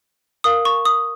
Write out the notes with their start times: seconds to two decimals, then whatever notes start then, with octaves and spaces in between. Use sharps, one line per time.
0.44 A#4 F5 D#6
0.65 C#6
0.85 D#6